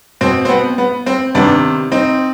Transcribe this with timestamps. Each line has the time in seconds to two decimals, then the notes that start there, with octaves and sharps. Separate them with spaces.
0.21 B2 C4
0.45 C4
0.49 B3
0.78 B3
1.06 C4
1.34 C3 D#3 B3 D4
1.91 C4 D#4